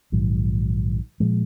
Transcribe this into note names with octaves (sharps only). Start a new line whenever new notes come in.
A#1 G#2 D#3 F#3
A#2 F3 G#3